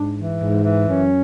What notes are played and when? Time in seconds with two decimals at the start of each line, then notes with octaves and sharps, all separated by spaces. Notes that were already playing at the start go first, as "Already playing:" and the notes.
Already playing: G#2 D4
0.17 E3
0.40 G#2
0.64 E3
0.87 F#2 C#4